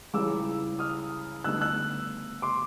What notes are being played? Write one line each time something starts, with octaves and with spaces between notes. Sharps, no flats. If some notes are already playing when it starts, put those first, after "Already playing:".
C#2 C#3 E3 G3 D6 E6
D#6 F6
D2 D3 G3 B3 D#4 E6 F#6
E6 F#6
C6 D6